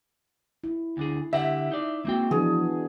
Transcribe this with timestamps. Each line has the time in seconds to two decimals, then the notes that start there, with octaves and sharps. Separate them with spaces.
0.64 E4
0.97 D2 D4 G#4
1.33 D3 G4 E5 F#5
1.71 D#4 D5
2.05 G#3 A#3 C4 F#4 G5
2.31 E3 F3 B3 D4 G#4